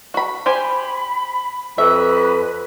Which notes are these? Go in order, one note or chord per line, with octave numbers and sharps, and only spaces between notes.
F#4 B5
G4 C5 G#5 B5
F2 B4 E5